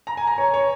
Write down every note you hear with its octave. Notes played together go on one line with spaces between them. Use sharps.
A#5
G#5
A#5
C#5
C#5